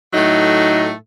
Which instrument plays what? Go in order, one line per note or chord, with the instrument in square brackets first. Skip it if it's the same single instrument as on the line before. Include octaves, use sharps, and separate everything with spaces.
[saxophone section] A2 F#3 A3 D#4